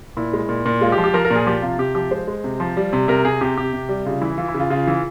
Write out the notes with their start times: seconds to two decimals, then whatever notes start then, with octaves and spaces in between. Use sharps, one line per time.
0.17 A#2 E4
0.33 G#3
0.49 A#2
0.66 A#2
0.81 G#3 F4
0.92 G4
0.98 F3
1.04 G4
1.14 F3 A#4
1.25 A#4
1.31 A#2
1.36 G#4
1.47 F3 G4
1.62 C3 F4
1.78 C3 G4
1.95 F3 G4
2.11 G#3 C5
2.27 G#3
2.44 C3
2.60 F3
2.77 G3
2.93 C3
3.08 C3 A#4
3.25 C3 G#4
3.41 C3 G4
3.57 C3 G4
3.73 C3
3.89 G3
4.06 C#3 F4
4.21 E3 E4
4.37 E3 F4
4.48 E4
4.54 C#3
4.60 F4
4.70 C#3 F4
4.87 E3